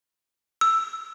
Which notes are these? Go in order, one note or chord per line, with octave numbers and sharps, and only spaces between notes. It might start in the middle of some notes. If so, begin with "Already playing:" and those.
E6